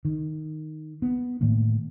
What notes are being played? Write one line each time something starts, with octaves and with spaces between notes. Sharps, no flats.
D#3
B3
A2 D#3 A3 A#3